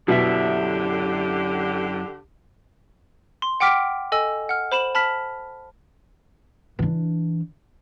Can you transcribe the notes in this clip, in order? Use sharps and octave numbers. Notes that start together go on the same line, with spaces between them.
F#2 B2 D3 E4 G4 E5
C6
F#5 G5 D6 F6 B6 D7
A4 D#5 G#5 E6
F#5 F6
C5 B5 E7 F#7
A5 B5 F6 B6
E3 D4